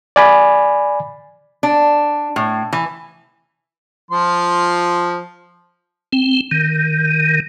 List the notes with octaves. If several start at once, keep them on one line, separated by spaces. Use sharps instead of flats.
D5 G#5 B5
D4
A2
E3
F3 F4 C6
C4
D#3